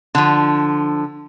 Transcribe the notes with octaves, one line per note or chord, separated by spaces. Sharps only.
D3 F3